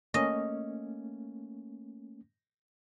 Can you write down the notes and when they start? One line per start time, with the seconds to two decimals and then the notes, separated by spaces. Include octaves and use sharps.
0.14 A3 A#3 C#4 D#5